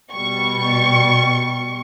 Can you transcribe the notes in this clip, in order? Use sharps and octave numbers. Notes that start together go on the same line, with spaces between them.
B2 G3 C#6